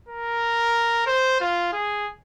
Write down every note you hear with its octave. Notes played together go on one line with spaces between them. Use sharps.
A#4
C5
F4
G#4